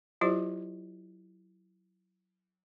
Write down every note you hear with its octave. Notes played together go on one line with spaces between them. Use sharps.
F#3 E4 F4 G4 C5 D5